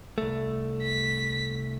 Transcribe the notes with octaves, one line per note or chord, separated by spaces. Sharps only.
C2 A3
B6